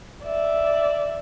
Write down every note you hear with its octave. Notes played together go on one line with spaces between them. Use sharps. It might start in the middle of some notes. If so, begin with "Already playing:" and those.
D5 E5